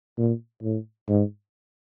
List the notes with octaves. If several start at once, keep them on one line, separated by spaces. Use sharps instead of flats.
A#2
A2
G#2